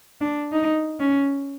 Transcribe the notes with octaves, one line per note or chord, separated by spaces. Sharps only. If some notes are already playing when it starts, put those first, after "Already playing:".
D4
D#4
C#4